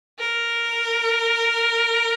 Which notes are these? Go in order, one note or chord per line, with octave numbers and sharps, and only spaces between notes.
A#4